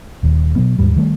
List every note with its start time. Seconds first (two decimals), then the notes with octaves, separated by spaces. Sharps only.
0.23 D#1 D#2
0.56 B2 F#3 B3
0.79 D#2 G#2 G3
0.96 D#3 G3 A3